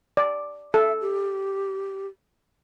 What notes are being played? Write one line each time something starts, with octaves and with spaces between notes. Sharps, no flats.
D5
A4 E5
G4